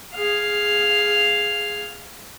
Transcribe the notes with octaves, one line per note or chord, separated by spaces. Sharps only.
G#4 F5